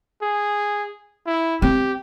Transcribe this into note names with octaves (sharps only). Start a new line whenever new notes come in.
G#4
E4
C4 G4